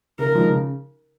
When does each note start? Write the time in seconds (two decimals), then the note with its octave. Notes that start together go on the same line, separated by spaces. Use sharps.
0.19 C#3 A#4
0.35 F3 G#3 D#4
0.49 C#3